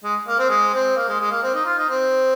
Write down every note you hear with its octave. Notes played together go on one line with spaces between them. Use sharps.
G#3
A#3
C4
G#3
C4
A#3
G#3
G#3
A#3
C4
D#4
F4
D#4
C4